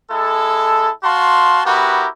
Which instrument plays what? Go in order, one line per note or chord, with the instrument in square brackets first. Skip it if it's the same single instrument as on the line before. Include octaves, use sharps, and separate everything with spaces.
[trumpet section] G#3 E4 A4
F#4 F5 A5 C6
B3 E4 F#4 G4 A#4